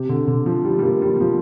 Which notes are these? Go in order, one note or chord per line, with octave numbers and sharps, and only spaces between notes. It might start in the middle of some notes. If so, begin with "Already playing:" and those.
Already playing: C3
D3
D3
F3
G3
G3
A#3
G3
G3
F3